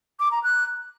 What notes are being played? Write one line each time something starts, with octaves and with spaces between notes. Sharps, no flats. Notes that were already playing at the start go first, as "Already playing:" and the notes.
D6
A#5
F#6